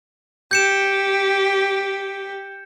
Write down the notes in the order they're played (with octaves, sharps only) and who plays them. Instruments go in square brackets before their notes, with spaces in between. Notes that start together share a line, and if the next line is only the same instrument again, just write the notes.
[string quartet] G4 [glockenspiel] G6 C#7 E7